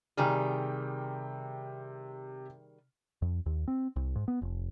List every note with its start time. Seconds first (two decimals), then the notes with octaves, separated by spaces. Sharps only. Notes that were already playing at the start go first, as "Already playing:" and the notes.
0.17 C3 D#3 G3 G#4 G5 F6
3.22 F2
3.46 D#2
3.68 C4
3.96 C2
4.15 G#2
4.28 B3
4.42 F1